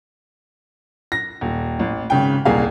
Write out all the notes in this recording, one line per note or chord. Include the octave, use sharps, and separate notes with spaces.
A#6
D#1
A1
G#1 C#3 G5
D#1 C2 A#3 G#4 F5